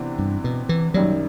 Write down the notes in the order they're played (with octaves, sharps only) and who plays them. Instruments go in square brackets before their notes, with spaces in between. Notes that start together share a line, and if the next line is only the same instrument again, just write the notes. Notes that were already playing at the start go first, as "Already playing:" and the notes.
Already playing: [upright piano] C3 E3 B3 D4
[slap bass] G2
B2
E3
[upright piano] F#2 D#3 G3 [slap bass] F#3